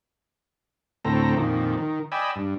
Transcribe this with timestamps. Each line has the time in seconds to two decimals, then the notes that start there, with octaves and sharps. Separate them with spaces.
1.05 D2 A2 C4 A4 A#5
1.37 F2 A#2 D#3
1.78 D#3
2.12 D5 D#5 G5 G#5 B5 E6
2.36 G2